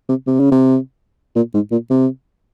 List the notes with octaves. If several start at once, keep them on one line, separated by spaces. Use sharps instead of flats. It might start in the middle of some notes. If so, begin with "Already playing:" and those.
C3
C3
C#3
C3
A#2
G#2
A#2
C3